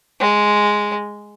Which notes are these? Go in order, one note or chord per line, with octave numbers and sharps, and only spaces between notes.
G#3